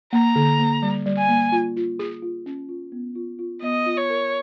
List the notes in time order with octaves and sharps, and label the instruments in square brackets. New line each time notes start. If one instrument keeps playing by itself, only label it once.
[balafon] A#3 [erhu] A#5
[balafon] D3
A#3
G3
G3
[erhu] G#5
[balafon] A#3
F4
F4
G#4
F4
C#4
F4
B3
F4
F4
[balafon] B3 [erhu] D#5
[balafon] F4
[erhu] C#5
[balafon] A#4